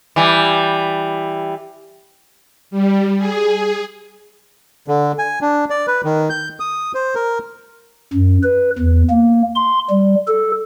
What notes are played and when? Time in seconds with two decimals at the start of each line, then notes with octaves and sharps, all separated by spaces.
0.16 E3 G3
2.71 G3
3.18 G#4
4.88 D3
5.19 G#5
5.41 D4
5.70 D5
5.87 B4
6.05 D#3
6.30 G6
6.60 D#6
6.95 C5
7.15 A#4
8.14 F#2
8.44 B4
8.79 E2
9.10 A#3
9.55 C6
9.90 G3
10.28 A4